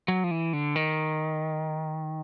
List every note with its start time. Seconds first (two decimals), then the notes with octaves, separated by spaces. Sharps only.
0.08 F#3
0.24 F3
0.31 E3
0.53 D3
0.76 D#3